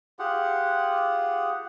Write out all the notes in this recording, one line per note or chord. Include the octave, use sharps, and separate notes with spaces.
F4 G4 G#4 F#5